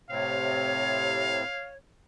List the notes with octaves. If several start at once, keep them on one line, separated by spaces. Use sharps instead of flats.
A2 C3 C4 C#5 F5